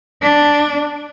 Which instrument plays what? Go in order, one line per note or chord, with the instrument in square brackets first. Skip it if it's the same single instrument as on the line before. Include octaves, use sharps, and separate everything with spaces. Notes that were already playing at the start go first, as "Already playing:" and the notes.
[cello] D4